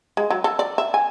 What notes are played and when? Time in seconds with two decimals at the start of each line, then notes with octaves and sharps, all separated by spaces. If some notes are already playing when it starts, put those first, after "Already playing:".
0.17 G#3
0.30 F#3
0.44 A4
0.59 D5
0.78 E5
0.94 G#5